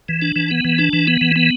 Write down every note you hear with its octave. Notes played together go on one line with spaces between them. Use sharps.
E3
D4
E3
B3
E3
D4
E3
B3
E3
B3